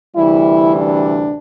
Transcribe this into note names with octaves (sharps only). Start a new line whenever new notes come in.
D2 C3 E3 G3 E4
D4